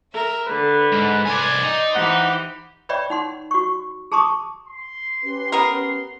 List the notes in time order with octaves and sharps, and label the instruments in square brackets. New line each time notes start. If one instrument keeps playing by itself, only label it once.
[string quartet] A#4 E5
[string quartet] D3 [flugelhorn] B4
[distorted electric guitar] G#2
[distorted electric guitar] C2 G#5 [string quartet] D5 C6
[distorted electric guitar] D#4
[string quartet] E3 G4 C5 [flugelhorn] F#5
[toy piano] B4 C#5 D5 E5 G5 B5
D#4 F#5 C6
F#4 C#6
G#4 A5 A#5 C6 C#6 D#6
[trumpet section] C6
[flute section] C#4 G4 B4
[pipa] B3 A#4